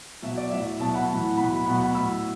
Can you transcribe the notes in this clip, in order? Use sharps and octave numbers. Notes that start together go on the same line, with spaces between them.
B2 F#3 E5
D5
A2 F#3 E5
B2 F#3 E5 A5
F#5 B5
A2 E3
B2 F#3 F#5 B5
B2 F#3 F#5 B5
F#5 B5
A2 F#3 B5 E6